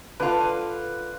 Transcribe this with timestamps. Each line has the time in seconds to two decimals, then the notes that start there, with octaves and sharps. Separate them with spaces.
0.20 D3 F4 B4